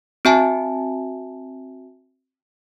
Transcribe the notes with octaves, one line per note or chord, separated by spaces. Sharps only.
C4 F#4 E5 G#5 A5